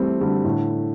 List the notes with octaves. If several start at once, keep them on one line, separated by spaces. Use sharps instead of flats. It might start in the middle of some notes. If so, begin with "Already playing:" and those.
Already playing: E3 G3 A3 C4
D3 G3
A2 D3